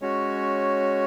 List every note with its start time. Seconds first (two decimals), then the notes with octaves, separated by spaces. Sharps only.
0.01 G#3 C#4 F#4 C#5